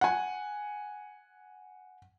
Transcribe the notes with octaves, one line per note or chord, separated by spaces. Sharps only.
F#5 G#5